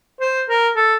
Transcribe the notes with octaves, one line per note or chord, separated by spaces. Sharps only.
C5
A#4
A4